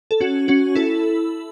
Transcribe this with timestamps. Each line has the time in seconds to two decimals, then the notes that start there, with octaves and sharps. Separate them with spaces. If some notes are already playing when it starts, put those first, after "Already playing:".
0.11 A4
0.20 C#4 F#4
0.48 C#4 F#4
0.75 E4 A4